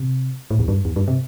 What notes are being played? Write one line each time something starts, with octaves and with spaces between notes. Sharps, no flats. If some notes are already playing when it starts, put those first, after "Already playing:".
Already playing: C3
A2
E2
G2
E2
G2
C3